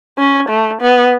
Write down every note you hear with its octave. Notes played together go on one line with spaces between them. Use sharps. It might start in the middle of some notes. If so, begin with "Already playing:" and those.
C#4
A3
B3